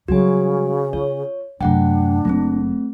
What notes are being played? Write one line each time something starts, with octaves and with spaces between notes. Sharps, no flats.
C#3 F#3 G3 F#4 G#5
F4 C#5
F#2 C3 A3 D4 F#5 G5
F#1 F#2 A3 C4